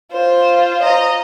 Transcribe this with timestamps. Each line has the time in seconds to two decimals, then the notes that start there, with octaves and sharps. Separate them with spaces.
0.12 F4 C5
0.82 D#5 A#5